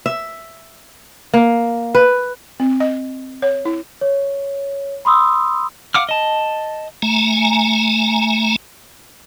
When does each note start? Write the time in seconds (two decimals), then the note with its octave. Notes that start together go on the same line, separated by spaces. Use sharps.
0.06 E5
1.33 A#3
1.95 B4
2.60 C4
2.80 D#5
3.42 C#5
3.65 E4
4.01 C#5
5.05 B5 C6 D#6 E6
5.95 F5 F#5 D6 F6
6.09 D#5 A5
7.02 A3 G#5 A#5